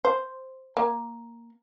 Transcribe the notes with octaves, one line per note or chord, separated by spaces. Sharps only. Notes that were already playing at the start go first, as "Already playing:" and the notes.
C5
A#3